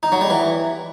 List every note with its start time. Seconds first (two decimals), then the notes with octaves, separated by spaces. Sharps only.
0.03 D#4
0.12 F#3
0.21 G3
0.30 E3